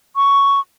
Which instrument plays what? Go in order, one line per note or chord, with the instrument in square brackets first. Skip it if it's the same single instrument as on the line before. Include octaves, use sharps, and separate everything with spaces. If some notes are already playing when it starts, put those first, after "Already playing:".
[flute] C#6